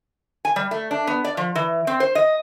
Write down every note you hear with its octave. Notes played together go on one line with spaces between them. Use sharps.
G#5
G3
A3
D4
B3
D5
F3
E3
C4
C5
D#5